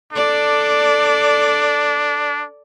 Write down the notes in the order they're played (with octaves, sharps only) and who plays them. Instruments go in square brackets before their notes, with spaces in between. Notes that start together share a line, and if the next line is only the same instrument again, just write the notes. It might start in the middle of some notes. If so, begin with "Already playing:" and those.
[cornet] D4 [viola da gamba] A4 D5